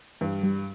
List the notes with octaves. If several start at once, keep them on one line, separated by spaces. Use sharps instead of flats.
G2 E3
G3